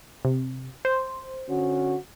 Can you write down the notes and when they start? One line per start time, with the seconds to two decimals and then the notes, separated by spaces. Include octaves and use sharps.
0.25 C3
0.85 C5
1.49 D3 C#4 F#4